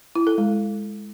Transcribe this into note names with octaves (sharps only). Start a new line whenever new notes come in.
E4
A4
G#3